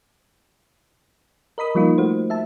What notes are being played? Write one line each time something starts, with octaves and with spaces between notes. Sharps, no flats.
A#4 D#5 B5 D#6
F3 G3 A#3 D#4 F4
A3 F#4 C5
E5 A5